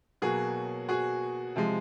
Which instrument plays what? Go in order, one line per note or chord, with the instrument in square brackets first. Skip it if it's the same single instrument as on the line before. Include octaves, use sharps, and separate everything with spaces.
[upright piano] B2 F#3 A#3 F#4 G#4
F#4 G#4
C3 F3 G#3